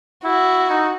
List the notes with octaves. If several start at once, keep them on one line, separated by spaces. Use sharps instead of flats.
E4 F#4
D#4